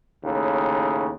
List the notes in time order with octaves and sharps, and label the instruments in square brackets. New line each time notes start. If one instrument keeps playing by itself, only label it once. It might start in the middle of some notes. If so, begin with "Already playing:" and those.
[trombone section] D#2 A2 C#3